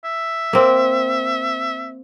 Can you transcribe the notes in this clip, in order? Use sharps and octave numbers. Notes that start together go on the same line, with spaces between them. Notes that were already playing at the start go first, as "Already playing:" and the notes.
E5
A#3 C4